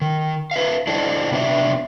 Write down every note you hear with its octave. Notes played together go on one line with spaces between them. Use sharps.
D#3
B4 E5 F5
D4 E4 A4 C5 D#5 F5
C3 B3 D4 C#5 E5